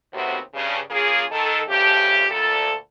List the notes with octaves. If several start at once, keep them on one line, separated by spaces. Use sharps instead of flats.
D#2 A2 C3 B3 C4 F#4
G2 C#3
C#3 A#3 F4 G#4
D#3 A4
G2 C#3 F3 A3 G4
D2 A#2 A4